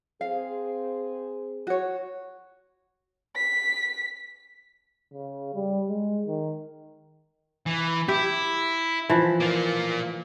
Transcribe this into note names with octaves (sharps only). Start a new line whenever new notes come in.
C4 G#4 F5
F#4 C#5
B6
C#3
G3
G#3
D#3
E3
E4 G4
E3 F3
A#3 F4